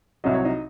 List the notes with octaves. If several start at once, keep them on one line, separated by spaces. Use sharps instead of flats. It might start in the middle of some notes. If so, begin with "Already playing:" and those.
C2 C3 F#3 D#5
C#5
D#4 D#5